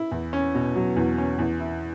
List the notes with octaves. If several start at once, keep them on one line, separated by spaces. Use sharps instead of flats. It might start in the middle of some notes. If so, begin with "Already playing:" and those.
Already playing: E4
E2
C#4
B2
F#3
E2
C#4
E2
E4